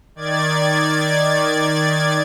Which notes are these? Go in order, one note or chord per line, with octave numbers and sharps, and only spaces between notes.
D#3 D5 G#6 A6